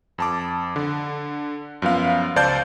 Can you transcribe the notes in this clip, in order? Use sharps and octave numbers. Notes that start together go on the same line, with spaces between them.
F2 A5 D6
D3
F#2 F3 B3 F5
C#2 C5 D5 F5 A5 G6